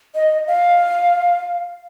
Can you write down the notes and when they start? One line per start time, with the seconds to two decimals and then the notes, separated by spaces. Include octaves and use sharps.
0.15 D#5
0.47 F5